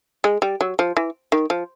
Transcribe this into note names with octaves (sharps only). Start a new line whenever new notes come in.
G#3
G3
F#3
F3
E3
D#3
F3